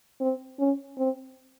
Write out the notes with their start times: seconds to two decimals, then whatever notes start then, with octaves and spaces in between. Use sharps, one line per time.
0.20 C4
0.59 C#4
0.98 C4